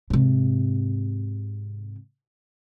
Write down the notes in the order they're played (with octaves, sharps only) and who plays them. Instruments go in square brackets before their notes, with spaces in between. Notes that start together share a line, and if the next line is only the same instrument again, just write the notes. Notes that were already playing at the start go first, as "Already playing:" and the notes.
[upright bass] G#2 C3